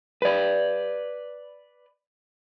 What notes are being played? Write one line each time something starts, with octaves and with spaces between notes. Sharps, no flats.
B4 D5